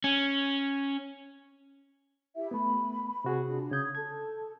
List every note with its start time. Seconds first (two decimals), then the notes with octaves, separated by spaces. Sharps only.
0.04 C#4
2.36 E4 G4 E5
2.51 A3 B3 B5
3.24 C3 F#4 G#4
3.44 D4 F4
3.71 C#3 D#6 G6 G#6
3.95 A4 A5 G#6